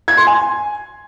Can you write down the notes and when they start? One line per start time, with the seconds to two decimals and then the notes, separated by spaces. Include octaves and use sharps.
0.08 G#6
0.17 C6
0.27 G#5